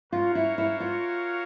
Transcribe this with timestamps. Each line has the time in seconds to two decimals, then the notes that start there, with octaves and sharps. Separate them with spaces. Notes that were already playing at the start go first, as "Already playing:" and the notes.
0.13 F4 F#4 A#4 C#5 F5
0.35 E4
0.58 E4
0.80 F4